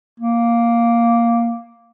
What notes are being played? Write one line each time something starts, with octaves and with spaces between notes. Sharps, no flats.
A#3